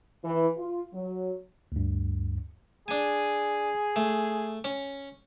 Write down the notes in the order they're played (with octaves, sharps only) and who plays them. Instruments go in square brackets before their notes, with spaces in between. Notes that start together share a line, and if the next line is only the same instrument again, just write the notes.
[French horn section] E3
F4
F#3
[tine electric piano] D2 G2
[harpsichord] D4 G#5 [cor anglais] G#4
[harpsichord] A3
C#4